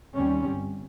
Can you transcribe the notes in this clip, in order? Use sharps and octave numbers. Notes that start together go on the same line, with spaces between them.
D#2 G3 C4 C#4
G1